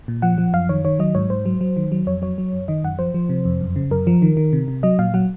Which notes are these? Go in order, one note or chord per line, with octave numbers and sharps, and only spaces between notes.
A#2
F3 F#5
F3
F#2 F5
D#3 C#5
D#3 C#5
F#3 D#5
G#2 C#5
G#2 C5
F#3
F#3
D#3
F#3
F2 C#5
F#3 C#5
F#3
F#2
D#3 D#5
F#2 F#5
F3 C5
F3
C3
F2
F#2
C#3
F#2 A#4
F3
D#3
D#3
C3
C3
F#3 D#5
A#2 F5
F#3 F#5